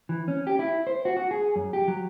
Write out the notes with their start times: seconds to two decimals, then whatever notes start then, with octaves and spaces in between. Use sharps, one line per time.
0.09 E3
0.28 C#4
0.47 G4
0.59 E4
0.87 C5
1.05 F#4
1.17 F#4
1.31 G#4
1.56 F#2
1.73 G4
1.88 F#3